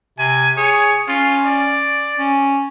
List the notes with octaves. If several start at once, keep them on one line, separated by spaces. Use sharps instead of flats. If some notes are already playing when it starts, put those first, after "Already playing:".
C3 G#5
G#4 C#5
C#4 F4
D5
C#4